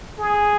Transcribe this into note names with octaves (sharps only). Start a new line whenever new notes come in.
G#4